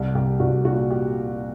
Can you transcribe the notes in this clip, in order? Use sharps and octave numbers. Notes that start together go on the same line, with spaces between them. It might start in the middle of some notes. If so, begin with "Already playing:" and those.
Already playing: C2
C2 G4
C2 F#4
A#2 F#4
G4